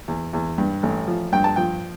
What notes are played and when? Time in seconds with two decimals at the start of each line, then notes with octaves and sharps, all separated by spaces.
0.08 E2
0.33 E2
0.58 G2
0.83 A1
1.08 F3
1.32 G2 G5
1.44 A5
1.56 F3 G5